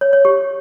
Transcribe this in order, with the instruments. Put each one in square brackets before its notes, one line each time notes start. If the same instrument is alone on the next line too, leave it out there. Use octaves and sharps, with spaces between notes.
[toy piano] C#5
C#5
G4